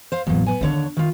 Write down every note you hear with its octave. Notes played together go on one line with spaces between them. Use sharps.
C5 F5
A1 E2 A#2 F#3
B3 G#5
D#2 D3 D4 D#4 C#5
D#3 F4